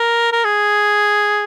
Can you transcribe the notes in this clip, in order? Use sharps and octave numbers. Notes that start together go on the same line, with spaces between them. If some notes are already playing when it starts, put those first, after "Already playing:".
Already playing: A#4
A#4
G#4